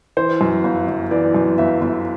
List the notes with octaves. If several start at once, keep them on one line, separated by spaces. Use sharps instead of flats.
E3 C5
F#2
G1
G1
E3 D5
F#2
G1 E5
G1